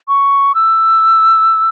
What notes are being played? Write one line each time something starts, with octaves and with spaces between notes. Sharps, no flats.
C#6
E6